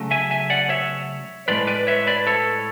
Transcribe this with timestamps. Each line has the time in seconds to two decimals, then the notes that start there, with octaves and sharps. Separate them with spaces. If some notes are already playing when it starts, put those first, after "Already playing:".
Already playing: C#3 F#3 A3
0.11 E5 G#5
0.31 E5 G#5
0.50 D5 F#5
0.69 C#5 E5
1.48 A2 G#3 B4 D5
1.67 B4 D5
1.87 C#5 E5
2.07 B4 D5
2.27 A4 C#5